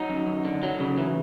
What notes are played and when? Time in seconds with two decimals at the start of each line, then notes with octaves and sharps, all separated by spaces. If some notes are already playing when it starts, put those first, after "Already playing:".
Already playing: F#3 D#4
0.10 F#2
0.27 F#2
0.45 D3
0.63 F#3
0.80 C#3
0.98 E3